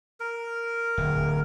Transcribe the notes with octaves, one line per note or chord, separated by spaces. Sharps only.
A#4
D1